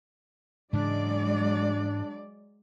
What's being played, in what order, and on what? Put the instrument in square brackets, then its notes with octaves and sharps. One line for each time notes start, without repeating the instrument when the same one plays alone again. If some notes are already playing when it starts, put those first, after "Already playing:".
[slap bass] G#2 C#3 E3 [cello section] F#3 G#3 D5 [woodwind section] D4